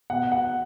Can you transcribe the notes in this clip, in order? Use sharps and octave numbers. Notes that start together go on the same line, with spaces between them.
B2 F#5
F#5